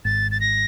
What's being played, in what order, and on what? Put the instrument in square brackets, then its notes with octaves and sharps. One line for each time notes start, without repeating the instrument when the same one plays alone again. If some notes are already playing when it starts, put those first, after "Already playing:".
[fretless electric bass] G#1 G#2 [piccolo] A6
[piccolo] A6
A#6